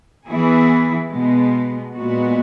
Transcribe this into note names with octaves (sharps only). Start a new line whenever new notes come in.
E3 B3 E4 G#4
B2 G#3 B3
A#2 G#3 B3 F#4